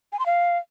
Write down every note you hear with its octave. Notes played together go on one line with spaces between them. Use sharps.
G#5
C6
F5